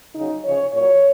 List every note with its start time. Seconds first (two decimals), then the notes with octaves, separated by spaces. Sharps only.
0.15 C#3 F#3 D#4
0.44 C#3 F3 C#5
0.73 A#2 F#3 C#5